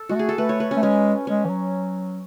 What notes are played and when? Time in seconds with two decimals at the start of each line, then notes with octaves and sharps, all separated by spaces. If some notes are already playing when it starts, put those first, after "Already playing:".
Already playing: A4
0.09 G#3 F#4
0.15 A3 G#4
0.29 A4
0.38 A3 B4
0.49 C#5
0.60 B4
0.71 C#4
0.76 A3
0.83 G#3 C#4
1.27 G#3 C#4
1.45 E3
1.50 F#3